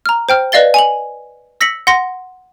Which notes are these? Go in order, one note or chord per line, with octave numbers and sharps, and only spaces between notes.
A#5 F6
C5 G5 F6
B4 D5 D#5 F5 A6 G7
G#5 F7 F#7
E6 A#6 B6 C#7 F#7
F#5 C6 A#6